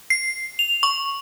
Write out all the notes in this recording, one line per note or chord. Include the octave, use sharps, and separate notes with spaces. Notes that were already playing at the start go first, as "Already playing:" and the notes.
C7
F7
C#6